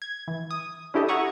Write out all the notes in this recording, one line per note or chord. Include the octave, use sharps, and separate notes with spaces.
G#6
E3
D#6
C#4 D4 E4 G4 A4 D#5
C#5 E5 F#5 A#5 C#6 D#6